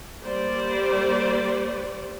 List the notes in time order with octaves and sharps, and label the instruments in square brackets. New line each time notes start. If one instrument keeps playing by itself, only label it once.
[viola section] G3 A#3 C5 D5